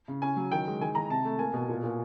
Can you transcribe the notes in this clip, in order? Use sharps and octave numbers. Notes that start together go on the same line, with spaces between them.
C#3
C#4 G#5
F#3
D#3 G5
G#3
D#3 G#5
D#3 A#5
C3 A5
A3
A#3 G#5
B2
A#2
A#2